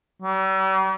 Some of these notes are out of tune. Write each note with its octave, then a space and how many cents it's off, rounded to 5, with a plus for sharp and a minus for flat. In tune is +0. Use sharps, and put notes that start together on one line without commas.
G3 -45